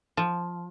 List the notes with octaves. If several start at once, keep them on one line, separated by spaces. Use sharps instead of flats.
F3